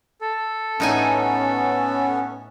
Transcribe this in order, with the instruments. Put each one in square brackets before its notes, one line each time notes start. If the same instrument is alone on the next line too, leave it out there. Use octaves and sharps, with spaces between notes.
[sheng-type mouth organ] A4
[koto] A2 D#4 G#5 [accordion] B3 C#4